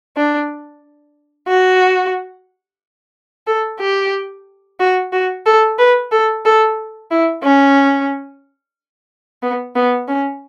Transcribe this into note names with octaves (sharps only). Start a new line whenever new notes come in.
D4
F#4
A4
G4
F#4
F#4
A4
B4
A4
A4
E4
C#4
B3
B3
C#4